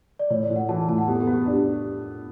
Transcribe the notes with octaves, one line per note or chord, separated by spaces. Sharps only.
D5
A2 C#5
D5
A2
F#5
E3 A5
A2 A5
F#5
B3 G4
A4
G4
B3
G4
D4